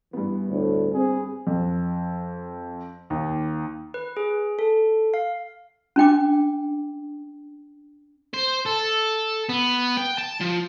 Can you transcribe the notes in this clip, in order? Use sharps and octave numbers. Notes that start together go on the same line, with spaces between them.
G2 E3 B3
D2 A2
C4 G#4
F2
D#2
B4
G#4
A4
F5
C#4 D4 G5 D6
C5
A4
B3
G5
A5
F3